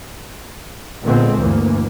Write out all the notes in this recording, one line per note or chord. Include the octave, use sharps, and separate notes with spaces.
A#2 D3 G#3 B3 C4
D2 G2 E3 A#3